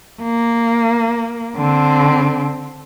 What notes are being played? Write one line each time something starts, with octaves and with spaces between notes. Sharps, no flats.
A#3
D3 C4